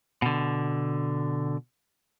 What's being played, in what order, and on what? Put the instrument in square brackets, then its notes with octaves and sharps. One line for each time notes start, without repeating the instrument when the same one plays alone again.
[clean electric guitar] B2 D3